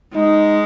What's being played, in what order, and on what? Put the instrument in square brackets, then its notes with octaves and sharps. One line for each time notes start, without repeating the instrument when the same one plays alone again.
[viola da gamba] G#3 [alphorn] D#4